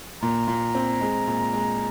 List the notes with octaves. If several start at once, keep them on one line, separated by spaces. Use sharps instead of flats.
A#2 A#5
A#2
C4
G#3
A#2
G#3